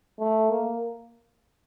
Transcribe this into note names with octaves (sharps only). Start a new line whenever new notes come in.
A3
A#3